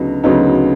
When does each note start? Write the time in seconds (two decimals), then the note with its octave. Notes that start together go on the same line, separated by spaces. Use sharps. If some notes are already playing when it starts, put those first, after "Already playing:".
Already playing: D2 C#3 F#3 B3 D#4
0.23 D2 C#3 F#3 B3 D#4